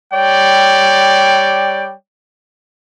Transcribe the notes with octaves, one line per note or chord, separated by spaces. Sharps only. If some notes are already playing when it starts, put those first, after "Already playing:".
G3 C#5 D5 G5